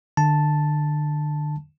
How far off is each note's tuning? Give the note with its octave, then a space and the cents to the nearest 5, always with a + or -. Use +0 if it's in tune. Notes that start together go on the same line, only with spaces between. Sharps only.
D3 +30 A5 +0